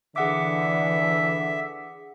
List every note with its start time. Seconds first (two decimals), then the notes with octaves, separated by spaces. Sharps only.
0.16 D3 E3 G#4 E5 F#5 D6